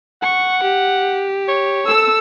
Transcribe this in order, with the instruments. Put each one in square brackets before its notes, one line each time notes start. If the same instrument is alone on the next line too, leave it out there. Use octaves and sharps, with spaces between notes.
[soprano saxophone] F#5 [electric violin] C#6
[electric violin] G4
[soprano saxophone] C#5
[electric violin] A4 [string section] E6